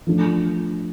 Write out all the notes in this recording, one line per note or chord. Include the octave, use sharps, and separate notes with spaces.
F3 A3 D4